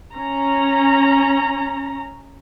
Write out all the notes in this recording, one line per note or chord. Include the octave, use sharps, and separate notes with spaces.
C#4 A#5